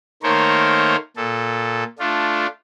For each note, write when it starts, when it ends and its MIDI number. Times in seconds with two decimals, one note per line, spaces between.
0.23 0.96 51
0.23 0.96 57
0.23 0.96 58
0.23 0.96 70
0.23 0.96 72
0.23 0.96 73
1.16 1.84 46
1.16 1.84 69
1.99 2.47 57
1.99 2.47 62
1.99 2.47 65